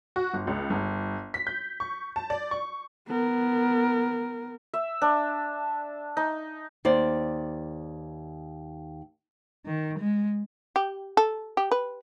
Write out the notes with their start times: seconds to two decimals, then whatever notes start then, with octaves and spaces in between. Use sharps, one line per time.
0.16 F#4
0.33 G1
0.47 C#2
0.70 G1
1.34 B6
1.47 G6
1.80 C#6
2.16 A5
2.30 D5
2.51 C#6
3.07 B3 A#4
4.74 E5
5.02 D4
6.17 D#4
6.85 D#2 C5 D5
9.66 D#3
10.00 G#3
10.76 G4
11.17 A4
11.57 G4
11.71 B4